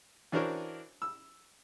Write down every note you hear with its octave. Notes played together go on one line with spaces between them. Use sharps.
E3 D4 F#4 A#4 C5 C#5
E6